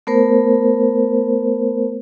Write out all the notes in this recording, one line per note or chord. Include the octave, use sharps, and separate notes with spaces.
A3 B3 A#4 C5